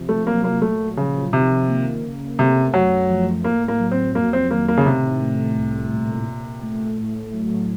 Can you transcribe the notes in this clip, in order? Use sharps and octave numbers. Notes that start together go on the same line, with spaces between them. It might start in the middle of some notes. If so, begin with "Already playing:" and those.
Already playing: C3 F3
A3
F#3 A#3
A#3
A#2 A3
C#3 F3
C3 D#3
A#3
C#3
C3 A3
F#2 F#3
F3
A2 A#3
A#3
F#3
C4
F2 A#3
C4
D#3 A#3
A#3
C#3
A2 C3
A3
C2
A#2
A#2
A3
A2
F#3